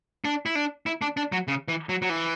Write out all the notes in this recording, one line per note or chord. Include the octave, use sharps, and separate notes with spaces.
D4
E4
D4
E4
D4
D4
F#3
C#3
E3
F#3
F#3
E3